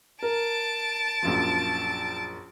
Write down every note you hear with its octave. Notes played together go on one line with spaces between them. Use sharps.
A#4 A5 D7
A#1 F#2 F3